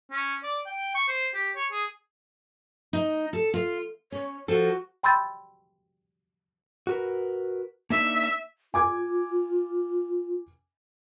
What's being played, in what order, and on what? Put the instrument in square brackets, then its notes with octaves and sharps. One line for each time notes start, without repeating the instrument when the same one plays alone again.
[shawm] C#4
D5
G5
C#6
C5
G4
C#5
G#4
[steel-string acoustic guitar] D#4
A4
F4
[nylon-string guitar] C#4 [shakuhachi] C#5
[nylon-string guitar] F3 A4 [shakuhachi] F#4
[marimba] G5 B5 C6 E6 G6 A6
[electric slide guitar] F#4 A#4 B4
[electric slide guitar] A#3 D4 D#4 [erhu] E5
[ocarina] F4 [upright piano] G#5 D6 G#6